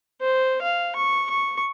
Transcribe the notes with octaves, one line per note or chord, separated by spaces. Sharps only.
C5
F5
C#6
C#6